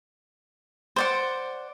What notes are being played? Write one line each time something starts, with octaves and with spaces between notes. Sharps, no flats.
C5 D5 F#5